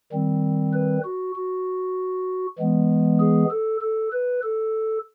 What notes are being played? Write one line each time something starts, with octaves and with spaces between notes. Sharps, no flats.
D#3 G3 C4
B4
F#4
F#4
E3 G#3 B3
G#4
A4
A4
B4
A4